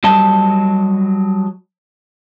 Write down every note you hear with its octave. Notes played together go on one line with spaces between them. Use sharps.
F#3 G3 D#5 A5